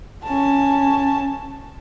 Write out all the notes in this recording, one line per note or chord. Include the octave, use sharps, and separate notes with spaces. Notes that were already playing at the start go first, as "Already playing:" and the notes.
C#4 A5